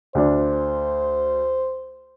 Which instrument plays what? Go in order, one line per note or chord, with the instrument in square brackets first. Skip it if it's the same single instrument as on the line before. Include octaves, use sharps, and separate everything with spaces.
[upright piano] D2 D4 [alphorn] C5